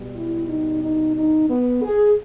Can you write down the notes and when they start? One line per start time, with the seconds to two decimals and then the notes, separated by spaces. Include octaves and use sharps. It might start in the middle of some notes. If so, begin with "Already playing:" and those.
Already playing: B2 G3
0.14 E4
0.47 D#4
0.82 D#4
1.15 D#4
1.48 B3
1.82 G#4